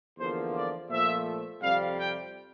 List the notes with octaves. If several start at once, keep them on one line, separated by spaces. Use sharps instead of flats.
E2 D3 F3 A#3 C5
D5
A#2 F3 A3 E5
F2 C3 G3 F5
G5